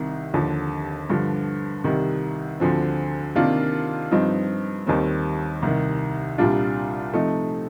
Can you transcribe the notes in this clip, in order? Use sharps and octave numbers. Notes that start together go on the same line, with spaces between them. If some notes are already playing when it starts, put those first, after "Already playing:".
Already playing: C2 C3 D#3
D#2 D3 F3
G2 D3 F3
C2 C3 D#3 G3
D2 D3 F3 C4
C3 D#3 A#3 D4 F4
G2 F3 C4 D#4
D#2 D#3 G3 C4
C2 C3 D#3
C2 A#2 G3 D4 F4
C3 F3 A3 D#4